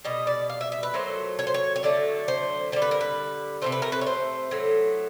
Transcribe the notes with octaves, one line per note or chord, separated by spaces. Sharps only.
B2 G3 D#5
D5
F5
E5
E5
B4
A#2 F#3 A3 C5
C#5
C5
C#5
C#5
D3 F#3 A3 D5
C5
D3 G3 C5
B4
A#4
B4
C3 E3 A3 C5
B4
A#4
B4
C#5
C5
A2 F#3 A3